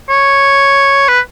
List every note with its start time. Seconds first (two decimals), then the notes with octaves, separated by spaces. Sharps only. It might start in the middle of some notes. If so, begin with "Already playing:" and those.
0.10 C#5
1.08 B4